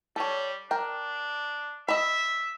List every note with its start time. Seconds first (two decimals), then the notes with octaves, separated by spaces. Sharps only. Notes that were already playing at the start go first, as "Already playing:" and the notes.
0.16 G3 A4 C#5
0.71 D4 A#4 G5
1.88 D#5 E5 B5